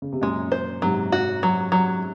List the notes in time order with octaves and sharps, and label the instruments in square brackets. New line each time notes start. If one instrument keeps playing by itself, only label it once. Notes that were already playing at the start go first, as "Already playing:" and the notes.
[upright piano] C#3
C3
[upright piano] F#2 A#2 [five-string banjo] G#3
[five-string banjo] C5
[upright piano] G#2 C3 [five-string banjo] F#3
[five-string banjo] F#4
F#3
F#3